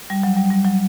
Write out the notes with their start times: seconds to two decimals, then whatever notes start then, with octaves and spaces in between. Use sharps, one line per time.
0.10 G3
0.23 F#3
0.37 G3
0.51 G3
0.64 F#3